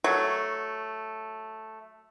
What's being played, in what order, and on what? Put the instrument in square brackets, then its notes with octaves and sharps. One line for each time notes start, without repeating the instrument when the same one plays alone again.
[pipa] F#3 A3